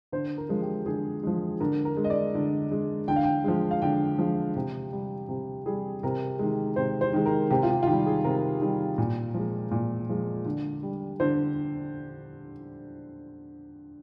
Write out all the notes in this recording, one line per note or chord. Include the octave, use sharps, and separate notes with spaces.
D3 C5
A#4
F3 G#3
G4
D3 G#4
F3 G#3
D3 A#4
A#4
G#3
D#5
D5
D3
G#3
D3 G5
F5
G5
F3 G#3
F5
D3 G5
F3 G#3
C3
G3
C3
G3 G#4
C3 A#4
D#3 G#3
C3 C5
C5
D#3 G#3
A#4
C3 G4
F4
G4
F4
D#3 G4
G3
G#4
C3 A#4
D#3 G3
A#2
F3 G#3
A#2
F3 G#3
D3
G3
D3 C5